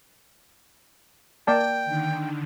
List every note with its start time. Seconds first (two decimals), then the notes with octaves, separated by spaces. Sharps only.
1.47 A#3 D5 G5 A5
1.85 D3 D#3